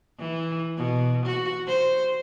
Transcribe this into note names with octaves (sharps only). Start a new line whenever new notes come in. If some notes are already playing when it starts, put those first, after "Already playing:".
E3
B2
F#4
C5